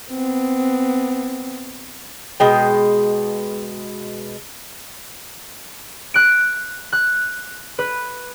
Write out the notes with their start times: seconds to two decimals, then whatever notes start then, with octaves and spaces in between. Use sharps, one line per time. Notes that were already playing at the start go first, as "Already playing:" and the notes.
0.11 B3 C4
2.40 B2 G#3 G5
6.14 F#6 D7
6.93 F#6
7.79 B4